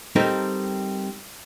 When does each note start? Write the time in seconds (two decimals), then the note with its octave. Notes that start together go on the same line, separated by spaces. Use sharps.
0.16 G3 C4 D#4 A4 A#4